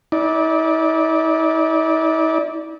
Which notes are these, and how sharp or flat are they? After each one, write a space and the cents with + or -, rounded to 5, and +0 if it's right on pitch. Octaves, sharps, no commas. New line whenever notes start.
E4 -45 D5 +0